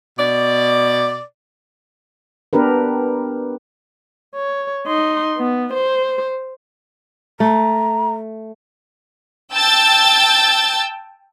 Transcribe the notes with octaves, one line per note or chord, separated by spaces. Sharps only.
B2 D5
B3 D4 G4 A#4 B4
C#5
D#4 C6
B3
C5
A3 A#5
G5 A5 E6 G6 A6